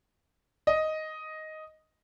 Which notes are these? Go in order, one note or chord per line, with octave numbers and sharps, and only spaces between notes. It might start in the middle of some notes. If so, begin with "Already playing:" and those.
D#5